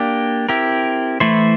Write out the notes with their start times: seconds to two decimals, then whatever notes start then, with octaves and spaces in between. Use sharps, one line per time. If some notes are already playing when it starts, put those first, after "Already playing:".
Already playing: A#3 D4 G4
0.49 C4 E4 G4 A#4
1.20 E3 A3 E4 A4 C5